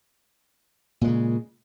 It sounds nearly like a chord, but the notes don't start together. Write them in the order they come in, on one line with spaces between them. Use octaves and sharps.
A#2 G#3 C#3